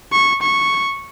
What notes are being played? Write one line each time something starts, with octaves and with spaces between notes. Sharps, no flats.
C#6
C#6